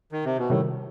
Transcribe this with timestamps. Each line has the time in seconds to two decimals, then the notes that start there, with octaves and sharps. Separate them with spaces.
0.12 D#3
0.24 C3
0.38 B2
0.50 A2 C3 D#3 G3